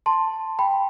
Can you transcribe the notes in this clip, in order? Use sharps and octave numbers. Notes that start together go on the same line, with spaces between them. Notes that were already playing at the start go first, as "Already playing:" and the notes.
A5 C6
G5 B5